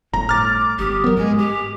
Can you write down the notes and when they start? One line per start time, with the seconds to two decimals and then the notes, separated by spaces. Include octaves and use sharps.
0.14 G1 A2 A#5
0.29 D6 F6 A6
0.79 G1 G4 D#6
1.04 F#3 B3 A#4
1.17 G#2 G#3 G#4
1.38 G4 G#4